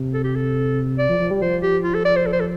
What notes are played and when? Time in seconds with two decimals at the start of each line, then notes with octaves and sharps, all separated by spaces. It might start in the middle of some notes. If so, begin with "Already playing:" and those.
Already playing: C3
0.14 A4
0.24 G4
0.36 A4
0.98 D5
1.09 F3
1.19 F3
1.31 G3
1.42 F3 C5
1.63 G4
1.84 F4
1.94 A4
2.05 D5
2.16 C5
2.26 A4
2.33 C5
2.40 A4